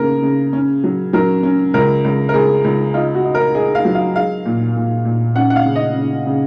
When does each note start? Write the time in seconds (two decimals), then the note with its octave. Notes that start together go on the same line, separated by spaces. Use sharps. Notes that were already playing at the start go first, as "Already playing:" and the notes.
Already playing: C#3 A#3 A#4
0.23 C#3
0.53 C#4
0.84 F#3
1.13 F#3 A#4
1.43 C#4
1.74 C#2 A#4
2.04 C#2
2.29 A#4
2.34 C#2 G#4
2.64 C#2
2.94 D#4 F4
3.15 F#4
3.24 D#4
3.35 A#4
3.54 D#4 G#4
3.75 F5
3.85 F#3
3.95 F5
4.15 G#3 F5
4.46 A#2
4.76 A#2
5.05 A#2
5.36 C#4 F#5
5.50 F#5
5.56 F5
5.65 C#3
5.75 D#5
5.96 C#3
6.26 C#3